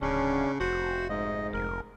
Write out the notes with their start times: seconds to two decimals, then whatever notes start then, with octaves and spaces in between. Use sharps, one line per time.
0.01 D1 C#3 C#4 D4
0.60 F1 F#4 C5
1.09 G#2 D#5
1.53 F1 A#4